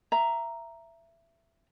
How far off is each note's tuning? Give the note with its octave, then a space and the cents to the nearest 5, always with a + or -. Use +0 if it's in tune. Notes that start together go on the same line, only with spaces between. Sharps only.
E5 +20 A#5 +0